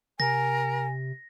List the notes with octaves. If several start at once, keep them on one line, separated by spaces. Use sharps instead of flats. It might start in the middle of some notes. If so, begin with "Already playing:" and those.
C3 A#4 G#5 A#6